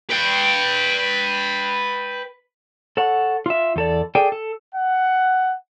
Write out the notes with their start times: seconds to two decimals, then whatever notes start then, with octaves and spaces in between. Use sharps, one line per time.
0.10 B4 G5
2.97 A4 C#5 F#5
3.46 F4 E5
3.76 E2 A4 D5
4.15 G#4 A4 D5 G5
4.32 A4
4.74 F#5